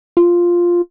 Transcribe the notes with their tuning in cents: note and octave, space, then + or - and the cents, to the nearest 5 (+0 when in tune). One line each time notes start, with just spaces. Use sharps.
F4 +0